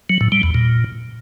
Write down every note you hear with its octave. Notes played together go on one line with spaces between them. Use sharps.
F#3
A2
G3
E2
A#2